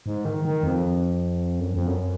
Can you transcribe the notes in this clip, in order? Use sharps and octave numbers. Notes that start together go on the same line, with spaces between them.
G#2
D#3
D#3
F2
F#2
F2
F#2